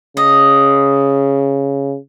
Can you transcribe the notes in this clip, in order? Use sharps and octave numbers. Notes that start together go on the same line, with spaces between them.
C#3 D#5